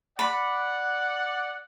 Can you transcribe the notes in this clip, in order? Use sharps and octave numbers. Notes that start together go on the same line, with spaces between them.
D5 F#5 B5